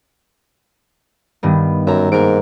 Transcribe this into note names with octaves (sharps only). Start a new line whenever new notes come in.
G2 D#3 B3
F#2 E5 A#5
G#2 A#3 A#4 D7